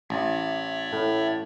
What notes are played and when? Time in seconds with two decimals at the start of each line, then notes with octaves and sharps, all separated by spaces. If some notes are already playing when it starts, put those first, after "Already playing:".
0.10 A1 C#5 D5 E5
0.92 A2